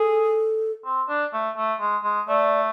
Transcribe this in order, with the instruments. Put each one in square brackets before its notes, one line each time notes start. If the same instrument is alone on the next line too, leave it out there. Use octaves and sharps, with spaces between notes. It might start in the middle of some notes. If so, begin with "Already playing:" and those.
Already playing: [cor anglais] G#4 [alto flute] A4
[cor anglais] C4
D4
A3
A3
G#3
G#3
[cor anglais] A3 [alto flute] D5